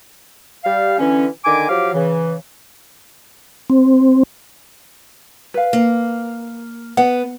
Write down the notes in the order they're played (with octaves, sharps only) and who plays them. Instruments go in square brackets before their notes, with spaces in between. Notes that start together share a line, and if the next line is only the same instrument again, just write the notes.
[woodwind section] G3 F5
D3 E3 C#4
D3 D#3 G#5 D6
F3 F#3 G4 F5 D6
C#3 E3
[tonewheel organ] C4
[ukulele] B4 F5
[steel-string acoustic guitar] A#3
[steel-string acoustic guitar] B3 [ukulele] F#5